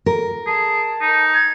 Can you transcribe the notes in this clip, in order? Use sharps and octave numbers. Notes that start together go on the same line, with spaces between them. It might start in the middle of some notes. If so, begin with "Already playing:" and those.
A#4
G#4 A5
D#4
G#6